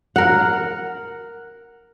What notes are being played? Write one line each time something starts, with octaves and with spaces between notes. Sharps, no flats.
A#4 F#5